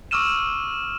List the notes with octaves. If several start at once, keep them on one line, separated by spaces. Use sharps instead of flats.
C#6 D6 E6 F6 D#7 E7